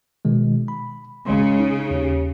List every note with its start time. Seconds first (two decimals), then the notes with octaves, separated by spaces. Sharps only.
0.25 B2 D#3 G#3
0.68 B5
1.26 G#1 C#3 G#3 C6
1.60 D#4
1.91 D#2 G4